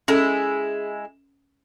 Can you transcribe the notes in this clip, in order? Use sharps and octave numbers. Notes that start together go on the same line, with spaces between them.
G#3 C#4 E4 A4